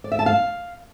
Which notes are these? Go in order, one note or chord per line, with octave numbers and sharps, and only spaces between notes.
D5
E5
A5
F5